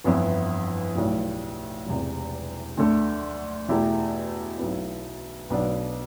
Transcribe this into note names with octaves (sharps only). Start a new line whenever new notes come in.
G1 F2 E3 B3 E4
B1 A2 G3
E1 E2 C3 G3
D2 D3 A3 D4 A4
E2 B2 A3 E4 G4
B1 B2 B3 E4
B1 B2 B3 D4